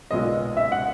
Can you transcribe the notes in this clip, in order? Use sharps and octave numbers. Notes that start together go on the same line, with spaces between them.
B1 A#2 G#3 B3 D#5
E5
F#5